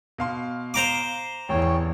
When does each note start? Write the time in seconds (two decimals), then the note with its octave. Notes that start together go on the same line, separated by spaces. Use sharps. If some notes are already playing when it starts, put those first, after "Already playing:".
0.18 B2 F5 C6
0.74 C5 A#5 D6
1.49 A1 E2 C#4 C#5 G5